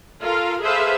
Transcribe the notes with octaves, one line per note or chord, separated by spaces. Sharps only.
F4 A4 A#4 F5
G#4 A4 B4 C5 E5 F5